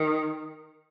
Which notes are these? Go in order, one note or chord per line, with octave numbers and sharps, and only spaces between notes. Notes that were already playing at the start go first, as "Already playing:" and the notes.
Already playing: D#3